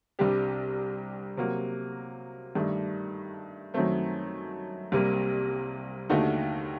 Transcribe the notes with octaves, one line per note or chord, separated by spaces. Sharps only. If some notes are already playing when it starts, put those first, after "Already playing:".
C2 C3 G3 D4 G4
C3 F#3 A#3 F#4
G2 D#3 A3 D4
F#2 D#3 F#3 A3 C4
C2 C3 G3 A#3
D#2 D3 A3 D#4 F#4